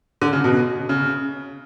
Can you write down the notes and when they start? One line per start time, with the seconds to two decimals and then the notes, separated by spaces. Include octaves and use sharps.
0.22 D3
0.33 C#3
0.44 B2
0.89 C#3